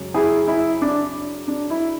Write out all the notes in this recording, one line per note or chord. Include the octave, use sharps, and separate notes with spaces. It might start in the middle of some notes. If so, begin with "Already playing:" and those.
Already playing: F#2 C#3 G#3 C#4
E4 G#4
E4
D4
D4
E4